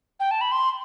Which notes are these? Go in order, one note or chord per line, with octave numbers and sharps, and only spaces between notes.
G5
A5
B5
C6